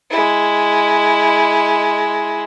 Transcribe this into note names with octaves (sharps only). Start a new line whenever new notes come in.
G#3 E4